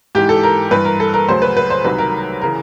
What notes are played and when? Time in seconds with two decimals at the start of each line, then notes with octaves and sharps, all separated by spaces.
0.15 G#2 E3 G4
0.29 A4
0.43 A#4
0.71 G2 E3 B4
0.85 A#4
1.00 A4
1.14 A#4
1.28 D2 C#3 F#3 C5
1.42 B4
1.57 B4
1.70 C5
1.84 C2 C3 D#3 F#3 B4
1.99 A#4
2.41 C#3 E3 A#4